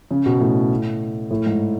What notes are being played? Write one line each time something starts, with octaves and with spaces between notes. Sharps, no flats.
C#3
B2
A2
A2
G#2